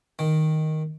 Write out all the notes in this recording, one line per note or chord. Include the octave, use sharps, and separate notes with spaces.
D#3